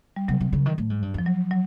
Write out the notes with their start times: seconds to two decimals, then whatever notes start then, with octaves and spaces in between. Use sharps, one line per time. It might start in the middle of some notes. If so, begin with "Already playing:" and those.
0.16 G3
0.28 C3 F#3
0.41 C3
0.53 C#3
0.66 D#3
0.78 A2
0.90 G#2
1.02 G2
1.14 F2 F3
1.26 F#3
1.51 F#3